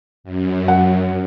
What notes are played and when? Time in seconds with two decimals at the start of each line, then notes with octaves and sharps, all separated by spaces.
0.24 F#2
0.68 F#5